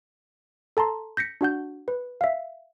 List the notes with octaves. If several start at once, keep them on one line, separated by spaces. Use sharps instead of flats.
A4 A5 A#5 C6
G6 A#6 B6 C#7
D4 F#4 F#5 G6
B4
E5 F5